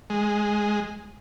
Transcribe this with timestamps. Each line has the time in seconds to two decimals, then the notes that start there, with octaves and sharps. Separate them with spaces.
0.10 G#3